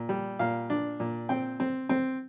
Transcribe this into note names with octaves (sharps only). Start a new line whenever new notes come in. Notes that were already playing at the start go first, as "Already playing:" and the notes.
Already playing: A#2
G3
A#2 F5
D4
A#2
C4 G5
C4
C4